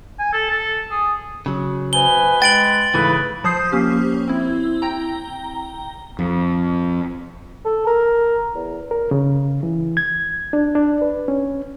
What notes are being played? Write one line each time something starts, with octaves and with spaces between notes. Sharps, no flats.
G#5
A4
A4
G#4
C#3 F#3
B2 B4 C5 G#5 G7
G#3 G5 A6 D7 F#7
G#2 C#3 E3 A3 B4
F3 C5 D#6 G6 C7
A#3 C#4 G4
C4 E4
G5 A#5
F2
A4
A#4
E2
A#4
C#3
E3
G#6
D4
D4
B4
C#4